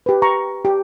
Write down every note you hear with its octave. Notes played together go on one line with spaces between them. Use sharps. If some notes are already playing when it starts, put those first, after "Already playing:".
G4 B4
A#5 C#6
G4